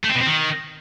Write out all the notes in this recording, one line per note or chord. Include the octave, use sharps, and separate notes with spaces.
A3
C4
B2
C4
D#3